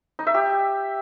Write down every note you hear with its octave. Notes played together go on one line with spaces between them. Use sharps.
D#4
E5
G4